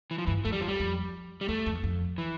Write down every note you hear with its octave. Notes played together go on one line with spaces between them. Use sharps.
E3
F3
G2 E3
F2 A3
G3
E2 F3
G3
F2
G3
E2 A3
F2
E2
F2
E3